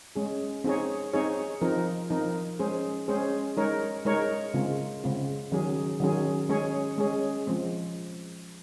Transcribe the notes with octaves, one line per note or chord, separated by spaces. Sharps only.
G#3 C#4 G#4
C4 D#4 G#4 C#5
C4 D#4 G#4 C#5
F3 C4 D#4 A#4
F3 C4 D#4 A#4
G#3 C#4 G#4 C5
G#3 C#4 G#4 C5
G#3 D#4 A#4 C#5
G#3 D#4 A#4 C#5
C#3 G#3 C4 F4
C#3 G#3 C4 F4
D#3 F#3 C#4 G#4
D#3 F#3 C#4 G#4
G#3 C#4 G#4 C#5
G#3 C#4 G#4 C#5
F3 G#3 C4